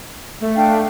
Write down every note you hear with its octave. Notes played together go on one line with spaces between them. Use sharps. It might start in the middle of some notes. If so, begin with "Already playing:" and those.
A3
D4 F5 G5